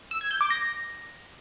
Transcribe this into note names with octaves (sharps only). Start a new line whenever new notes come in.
E6
G#6
G6
D6
A#6